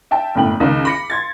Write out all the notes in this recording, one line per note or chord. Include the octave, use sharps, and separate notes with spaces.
E5 G5 A5
G1 F#2 A2 G5 F#7
C#2 D#3
B5 D6 A#6 C#7
C6 G#6 A6